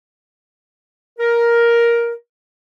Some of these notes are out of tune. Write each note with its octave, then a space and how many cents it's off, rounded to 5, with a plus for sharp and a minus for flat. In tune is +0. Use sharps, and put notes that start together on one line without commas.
A#4 +10